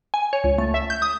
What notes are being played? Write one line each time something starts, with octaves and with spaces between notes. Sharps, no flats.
G#5
C#5
C#2
A3
E5
G6
D#6